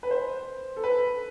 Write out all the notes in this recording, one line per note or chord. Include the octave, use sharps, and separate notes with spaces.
B4
C5
A4
B4